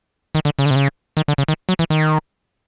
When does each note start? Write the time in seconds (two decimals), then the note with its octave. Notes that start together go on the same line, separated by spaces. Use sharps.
0.35 D#3
0.45 D3
0.59 C#3
0.66 D3
0.71 C3
0.76 C#3
1.17 D#3
1.28 D3
1.38 C#3
1.48 D#3
1.69 F#3
1.79 E3
1.90 D#3